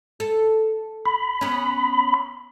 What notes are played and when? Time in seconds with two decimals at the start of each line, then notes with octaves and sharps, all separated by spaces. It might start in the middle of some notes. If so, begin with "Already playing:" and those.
0.20 A4
1.06 B5
1.41 B3 C#4